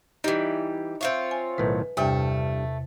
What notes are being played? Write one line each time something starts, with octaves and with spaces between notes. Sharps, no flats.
E3 G3 D#4
C4 F4 C#5 E5
G#5
B1 A2 D#3 B4
E2 G2 C3 G3 A3 G5